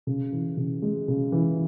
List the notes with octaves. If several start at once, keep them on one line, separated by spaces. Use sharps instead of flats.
C#3
E3
C#3
G#3
C#3
E3